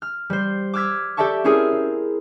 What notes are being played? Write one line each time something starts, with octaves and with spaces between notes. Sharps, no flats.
F6
G3 C5
D6 E6 F6 G#6 B6
G4 A4 D5 E5 A5 C#6
C4 C#4 E4 G#4 A#4
C4